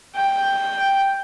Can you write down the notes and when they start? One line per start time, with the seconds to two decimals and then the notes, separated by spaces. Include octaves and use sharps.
0.16 G5